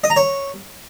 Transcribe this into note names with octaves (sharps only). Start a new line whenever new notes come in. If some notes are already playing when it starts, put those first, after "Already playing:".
D#5
A#5
C#5